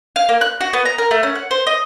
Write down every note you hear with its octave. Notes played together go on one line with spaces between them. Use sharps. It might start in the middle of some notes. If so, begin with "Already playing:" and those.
F5
A#3
F#6
F#4
B3
A#5
A#4
A3
C#4
F#5
C5
D#5